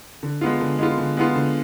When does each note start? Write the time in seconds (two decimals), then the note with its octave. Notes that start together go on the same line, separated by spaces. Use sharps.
0.23 D3
0.41 G#3 B3 F4
0.61 D3
0.79 G#3 B3 F4
0.98 D3
1.17 G#3 B3 F4
1.36 D3